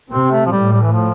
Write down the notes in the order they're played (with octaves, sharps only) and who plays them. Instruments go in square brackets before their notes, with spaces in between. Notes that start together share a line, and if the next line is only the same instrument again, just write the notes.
[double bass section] C3 [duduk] C4
[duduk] A3
F3
[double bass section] A2 [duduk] G3
[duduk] G3
E3
F3